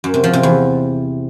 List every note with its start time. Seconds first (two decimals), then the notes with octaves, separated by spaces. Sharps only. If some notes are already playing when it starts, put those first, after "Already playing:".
0.04 F#2
0.14 C3
0.24 F3
0.33 C3
0.43 E2